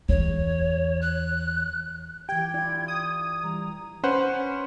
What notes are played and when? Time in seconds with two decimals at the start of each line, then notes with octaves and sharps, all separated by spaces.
0.09 E2 C#5
1.02 F#6
2.29 E3 G4 G5 G#6
2.54 E4 F4 D5
2.88 D#6
3.44 E3 G3 A#5
4.03 C#4 B4 C5 F#5